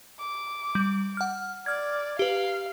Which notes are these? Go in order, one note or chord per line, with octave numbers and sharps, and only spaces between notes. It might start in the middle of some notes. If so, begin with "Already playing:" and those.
D6
G3
F#5 F6
D5 F6 G#6
G4 B4 F5